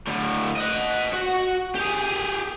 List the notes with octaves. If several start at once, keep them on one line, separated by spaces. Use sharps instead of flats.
A2 D3
D#5 F#5
F#4
G4 G#4